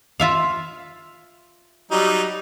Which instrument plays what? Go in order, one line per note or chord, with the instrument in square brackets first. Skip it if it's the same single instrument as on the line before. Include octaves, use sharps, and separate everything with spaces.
[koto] F4 E5 F5
[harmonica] F#3 G3 D#4